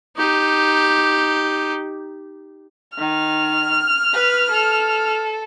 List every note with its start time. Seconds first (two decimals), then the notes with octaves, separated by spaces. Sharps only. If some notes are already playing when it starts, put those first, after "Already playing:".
0.17 D#4 G4
2.98 D#3 F6
4.13 B4
4.51 A4